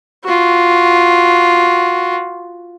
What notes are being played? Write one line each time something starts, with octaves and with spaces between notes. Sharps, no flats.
F4 F#4